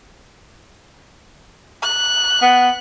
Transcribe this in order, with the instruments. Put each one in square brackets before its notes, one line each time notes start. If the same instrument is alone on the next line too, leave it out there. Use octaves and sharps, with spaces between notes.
[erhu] F#6
[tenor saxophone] B3